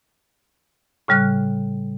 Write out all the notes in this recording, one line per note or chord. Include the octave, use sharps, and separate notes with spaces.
A2 C#3 G3 F6 F#6